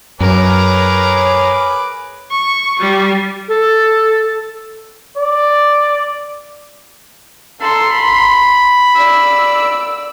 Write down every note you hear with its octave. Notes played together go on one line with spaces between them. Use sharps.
F#2 G#4 A#4 B4 C#5 A#5 D6
C#6
G3
A4
D5
A4 A#5 C6
B5
D5 E6